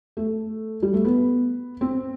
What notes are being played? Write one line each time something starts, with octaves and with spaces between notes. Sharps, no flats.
A3
G3
A3
B3
C4